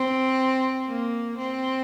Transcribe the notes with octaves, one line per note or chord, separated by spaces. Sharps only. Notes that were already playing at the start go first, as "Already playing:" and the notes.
Already playing: C4
A#3
C4